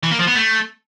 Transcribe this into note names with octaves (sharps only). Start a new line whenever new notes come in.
E3
A#3
F3
B3
A3